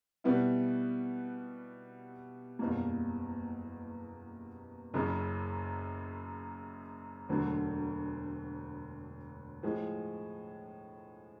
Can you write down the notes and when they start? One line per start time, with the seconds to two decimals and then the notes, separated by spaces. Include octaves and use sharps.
0.24 B2 G3 B3 E4
2.59 F#1 E2 B2 G3 A#3
4.94 F#1 F#2 C#3
7.29 E1 D2 D3 F#3
9.63 A2 F3 G#3